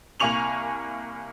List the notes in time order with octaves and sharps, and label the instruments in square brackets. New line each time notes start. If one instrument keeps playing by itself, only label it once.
[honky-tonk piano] C2 A#3 G#5 C#6 F7 F#7